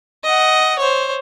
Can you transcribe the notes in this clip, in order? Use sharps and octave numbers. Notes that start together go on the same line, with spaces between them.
D#5 F#5
C5 C#5